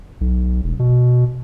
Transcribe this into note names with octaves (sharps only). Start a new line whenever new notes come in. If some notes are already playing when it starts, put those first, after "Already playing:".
B1
E1
B2